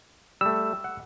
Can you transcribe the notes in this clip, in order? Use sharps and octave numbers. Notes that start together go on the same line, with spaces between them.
G3 A3 E6
F#5